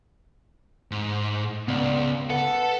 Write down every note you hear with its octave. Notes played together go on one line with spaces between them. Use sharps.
G#2
C#2 B3 D5
A4 B4 F#5